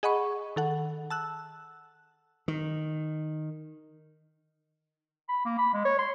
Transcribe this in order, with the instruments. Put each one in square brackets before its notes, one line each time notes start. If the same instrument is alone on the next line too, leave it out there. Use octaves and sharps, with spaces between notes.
[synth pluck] G#4 D#5 F#5 B5 C#6
D#3 A4 F#5
A5 E6 F#6
[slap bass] D#3
[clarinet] B5
A#3
B5
G#3
C#5
C6